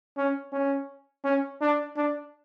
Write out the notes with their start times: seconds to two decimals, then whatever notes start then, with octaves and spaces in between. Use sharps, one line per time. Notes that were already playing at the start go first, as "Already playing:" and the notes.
0.18 C#4
0.53 C#4
1.24 C#4
1.61 D4
1.97 D4